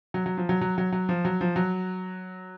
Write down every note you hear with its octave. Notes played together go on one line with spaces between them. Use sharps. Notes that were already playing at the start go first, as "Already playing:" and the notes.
F#3
F#3
F3
F#3
F#3
F#3
F#3
F3
F#3
F3
F#3